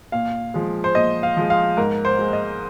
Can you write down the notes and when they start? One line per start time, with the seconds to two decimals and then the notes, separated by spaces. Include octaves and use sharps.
0.12 A#2 F5
0.54 F3 G#3
0.84 C5
0.95 A#2 D#5
1.23 F5
1.37 F3 G#3
1.50 F5
1.77 G#2 A#4
2.05 C5
2.19 G#3
2.33 D#5